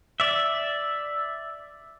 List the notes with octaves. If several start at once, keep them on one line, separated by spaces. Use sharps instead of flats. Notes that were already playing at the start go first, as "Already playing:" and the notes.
D5 E5